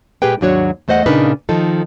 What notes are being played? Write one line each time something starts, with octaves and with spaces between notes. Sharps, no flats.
A#2 G#3 G4 G#4 B4 G5
D#2 G#2 F#3 D4 F#4 C#5
E2 A3 C5 D#5 F#5
A#2 C#3 D4 D#4 A#4 B4
D#3 F3 D#4 A4